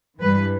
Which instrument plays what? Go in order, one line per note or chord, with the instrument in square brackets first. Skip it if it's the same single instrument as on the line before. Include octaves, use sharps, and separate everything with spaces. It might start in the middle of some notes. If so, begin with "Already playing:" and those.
[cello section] G2 E3 G3 B4